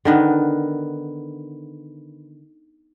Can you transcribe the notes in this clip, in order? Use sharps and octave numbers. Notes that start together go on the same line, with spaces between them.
D3 D#3 B3